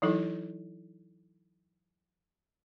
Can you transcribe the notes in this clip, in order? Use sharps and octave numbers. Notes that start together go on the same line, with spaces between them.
E3 F#3 D#4 E4 A4